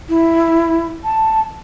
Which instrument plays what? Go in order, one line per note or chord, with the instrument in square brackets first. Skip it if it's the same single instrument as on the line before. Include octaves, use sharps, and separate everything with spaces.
[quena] E4
A5